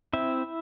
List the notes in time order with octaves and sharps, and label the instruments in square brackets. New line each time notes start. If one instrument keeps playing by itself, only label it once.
[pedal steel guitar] C4 E4 E5